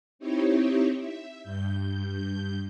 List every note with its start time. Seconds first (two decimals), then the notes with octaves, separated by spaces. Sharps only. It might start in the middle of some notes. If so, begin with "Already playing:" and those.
0.19 C4 D#4 E4 G4 C#5
0.98 E5
1.42 G2 G6